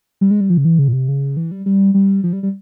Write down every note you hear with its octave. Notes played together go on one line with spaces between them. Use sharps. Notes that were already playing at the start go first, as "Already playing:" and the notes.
G3
G#3
G3
F3
C#3
E3
C#3
A#2
C3
C#3
E3
G3
G3
G3
F3
G3
G3